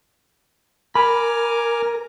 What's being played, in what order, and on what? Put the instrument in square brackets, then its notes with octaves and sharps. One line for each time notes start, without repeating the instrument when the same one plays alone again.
[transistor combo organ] A#4 [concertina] G#5 D6 F6 [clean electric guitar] B5